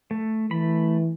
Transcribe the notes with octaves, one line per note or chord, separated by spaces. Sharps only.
A3
E3 A3 B5